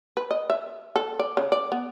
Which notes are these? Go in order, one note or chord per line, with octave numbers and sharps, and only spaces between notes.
B4
D#5
E5
A4
D5
C#3
D5
B3